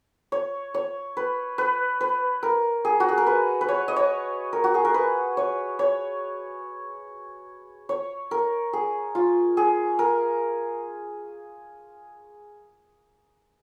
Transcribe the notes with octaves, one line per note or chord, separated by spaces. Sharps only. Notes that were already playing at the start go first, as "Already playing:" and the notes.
C#5
C#5
B4
B4
B4
A#4
G#4
F#4
G#4
A#4
B4
B4
C#5
D#5
C#5
A#4
F#4
G#4
A#4
B4
C#5
C#5
C#5
A#4
G#4
F4
G#4
A#4